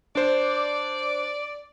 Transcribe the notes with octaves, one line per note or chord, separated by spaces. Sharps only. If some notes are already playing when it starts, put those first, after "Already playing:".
D4 C5 D5